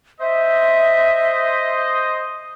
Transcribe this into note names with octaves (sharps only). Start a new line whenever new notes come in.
C5 D#5 E5